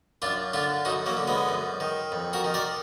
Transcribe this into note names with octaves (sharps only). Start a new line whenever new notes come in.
F#2 D4 F4
D3 D4 F4
F#2 D#4 F#4
F#3 A#3
D3
G#3 B3
F#2
D#3
F2
F#4 A#4
D#3
A#4 D5